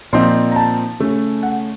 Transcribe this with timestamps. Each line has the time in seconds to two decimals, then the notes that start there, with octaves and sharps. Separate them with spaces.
0.13 A#2 F3 C4 D#4 C6
0.52 A#5
0.56 A5
1.00 C#3 A3 C#4
1.43 F#5